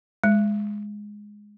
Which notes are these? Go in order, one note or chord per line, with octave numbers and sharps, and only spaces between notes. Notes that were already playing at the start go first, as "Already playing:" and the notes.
G#3